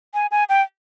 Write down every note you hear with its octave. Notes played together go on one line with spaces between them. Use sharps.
G#5
G#5
G5